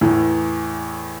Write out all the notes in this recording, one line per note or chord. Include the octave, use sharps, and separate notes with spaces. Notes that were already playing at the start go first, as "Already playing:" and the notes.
E2 A2 E3